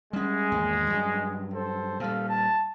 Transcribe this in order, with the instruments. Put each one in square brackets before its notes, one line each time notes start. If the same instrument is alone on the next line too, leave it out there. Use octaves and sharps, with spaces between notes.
[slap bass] G3 C#4 [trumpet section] G#3
[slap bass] G#1 E2 A#3
G2 F#3
[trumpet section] A4 C5
[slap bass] A#2 G3 [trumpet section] A4 F5
[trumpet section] A5